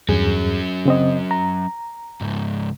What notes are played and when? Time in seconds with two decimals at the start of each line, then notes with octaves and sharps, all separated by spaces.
0.09 E2 G2 F#3 C#4 G#4
0.86 C#3 C4 D#5
1.31 A#5
2.21 C#2 G#2